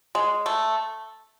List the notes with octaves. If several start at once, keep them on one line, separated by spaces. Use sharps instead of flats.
G#3
A3